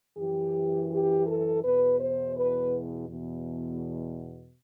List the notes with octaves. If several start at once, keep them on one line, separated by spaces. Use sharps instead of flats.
F#2 E3 G4
G4
A4
E2 B2 B4
C5
B4
E2 B2